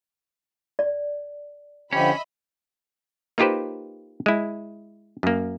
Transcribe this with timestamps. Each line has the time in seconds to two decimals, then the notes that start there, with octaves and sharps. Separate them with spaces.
0.79 D5
1.93 D3 F3 C#4 G4 D#5 E5 B5
3.38 A#3 D#4 F4 G4 B4 C5
4.26 G#3 E4
5.23 F#2 A#3